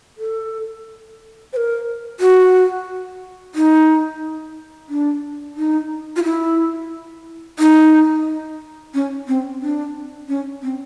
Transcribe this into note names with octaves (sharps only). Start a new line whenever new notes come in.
A4
C5
A#4
F#4
D#4
D4
D#4
F4
E4
D#4
C#4
C4
D4
C#4
C4